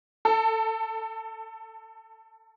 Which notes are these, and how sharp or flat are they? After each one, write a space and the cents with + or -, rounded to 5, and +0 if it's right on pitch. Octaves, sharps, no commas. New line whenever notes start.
A4 +15